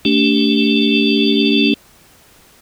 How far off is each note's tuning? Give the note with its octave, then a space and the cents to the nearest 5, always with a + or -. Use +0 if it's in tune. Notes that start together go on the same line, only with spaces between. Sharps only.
A3 +10 D4 -35 G4 +0